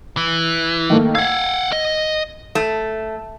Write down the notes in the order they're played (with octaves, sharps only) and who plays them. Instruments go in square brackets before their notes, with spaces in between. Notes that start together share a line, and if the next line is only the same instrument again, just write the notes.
[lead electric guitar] E3
[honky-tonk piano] D#3 A3 A#3
[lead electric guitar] F5 F#5 [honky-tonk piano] E6 G#6
[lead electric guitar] D#5
[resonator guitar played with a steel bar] A3